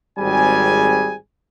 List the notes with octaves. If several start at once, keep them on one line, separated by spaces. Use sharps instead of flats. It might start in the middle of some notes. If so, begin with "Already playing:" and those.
G#1 G3 C4 G#4 G#5